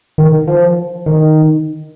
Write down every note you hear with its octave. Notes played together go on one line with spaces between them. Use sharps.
D#3
F3
D#3